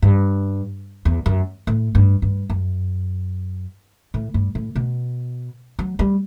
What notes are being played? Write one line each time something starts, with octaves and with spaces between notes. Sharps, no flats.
G2
E2
F#2
A2
G2
G2
F#2
A2
G2
A2
B2
F#3
G3